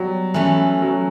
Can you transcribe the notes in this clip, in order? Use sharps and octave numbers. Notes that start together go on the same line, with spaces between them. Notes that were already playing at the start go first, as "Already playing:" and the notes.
Already playing: F#3 G3 B3
E3 A3 C#4
F#3